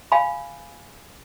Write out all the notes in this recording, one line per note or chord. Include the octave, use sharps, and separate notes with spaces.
F5 G#5 B5